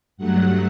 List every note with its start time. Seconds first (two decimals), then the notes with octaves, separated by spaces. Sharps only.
0.17 G2 F#3 A3 F#5